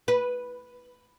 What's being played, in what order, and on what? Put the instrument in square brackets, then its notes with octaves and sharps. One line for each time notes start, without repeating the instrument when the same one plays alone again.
[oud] B4